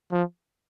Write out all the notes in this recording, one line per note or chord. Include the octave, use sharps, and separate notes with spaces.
F3